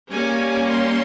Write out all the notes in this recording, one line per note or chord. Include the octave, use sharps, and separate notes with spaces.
G3 A#3 C#4 G#5
C6